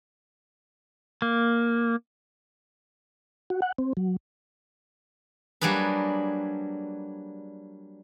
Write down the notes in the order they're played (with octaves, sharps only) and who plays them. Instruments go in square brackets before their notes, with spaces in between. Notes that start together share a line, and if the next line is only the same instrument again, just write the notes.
[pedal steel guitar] A#3
[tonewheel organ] F#4
F#5
C4
F#3
[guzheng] F#3 G3 A#3 D4 G#4 B4